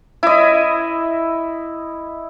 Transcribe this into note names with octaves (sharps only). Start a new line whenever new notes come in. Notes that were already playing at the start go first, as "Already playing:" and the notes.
E4 D#5